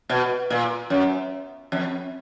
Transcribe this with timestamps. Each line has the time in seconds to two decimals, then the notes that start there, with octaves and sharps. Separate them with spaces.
0.09 B2
0.50 A#2
0.90 F#2
1.72 F2